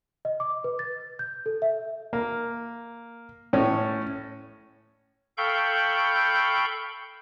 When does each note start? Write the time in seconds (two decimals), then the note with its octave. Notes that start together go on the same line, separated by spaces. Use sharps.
0.25 D#5
0.40 D6
0.64 B4
0.79 A6
1.19 G6
1.46 A4
1.62 E5
2.13 A#3
3.53 A2 A3 C#4
5.38 A4 F5 G5 B5 C#6 G6